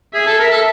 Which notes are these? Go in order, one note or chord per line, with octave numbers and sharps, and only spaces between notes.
G#4 E5
A4
A#4
A4